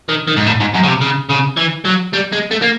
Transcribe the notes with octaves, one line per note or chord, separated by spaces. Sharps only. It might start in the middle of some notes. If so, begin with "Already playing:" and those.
D#3
D#3
G#2
A2
G#2
F#2
C#3
C3
C#3
C#3
E3
F#3
G3
G#3
A3
A#3